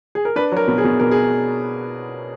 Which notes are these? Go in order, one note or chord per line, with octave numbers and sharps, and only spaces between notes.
G#4
A#4
D4 B4
F#3 A#4
B2
G#4
B2
B2 A#4
G#4